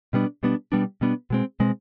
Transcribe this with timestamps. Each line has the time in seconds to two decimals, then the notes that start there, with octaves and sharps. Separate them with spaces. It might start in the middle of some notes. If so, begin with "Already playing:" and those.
0.13 B2 G3 B3 D4
0.43 B2 G3 B3 D4
0.72 B2 G3 B3 D4
1.01 B2 G3 B3 D4
1.30 B2 G#3 C4
1.60 B2 G#3 C4